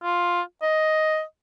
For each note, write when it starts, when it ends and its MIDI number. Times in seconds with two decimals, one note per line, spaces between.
0.03 0.41 65
0.62 1.22 75